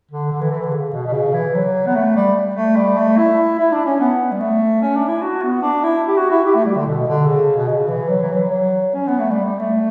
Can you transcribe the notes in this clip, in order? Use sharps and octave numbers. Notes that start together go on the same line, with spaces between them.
D3
D3
E3
E3
D3
C#3
B2
B2
C#3
E3
F#3
B3
A3
G3
A3
G3
A3
E4
E4
D4
C#4
B3
G3
A3
C#4
D4
E4
F#4
B3
D4
E4
G4
F#4
E4
G4
A3
G3
D3
B2
D3
C#3
B2
C#3
E3
F#3
E3
F#3
F#3
C#4
B3
A3
G3
G3
A3